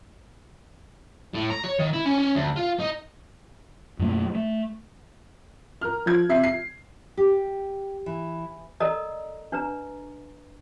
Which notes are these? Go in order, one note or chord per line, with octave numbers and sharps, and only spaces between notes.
A2
A#5
C#5
D#3
E4
C#4
C#4
D2
F4
D#4
F#2 B2 A3 A#3
A3
A#4 F6
F3 G#6
C3 E5 C7
C7
G4
E3
A4 A#4 D5 D#5 A#5
D4 B4 A#5